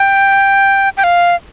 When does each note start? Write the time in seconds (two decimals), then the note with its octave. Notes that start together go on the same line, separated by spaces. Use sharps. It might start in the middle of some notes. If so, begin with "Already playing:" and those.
Already playing: G5
0.97 G5
1.04 F5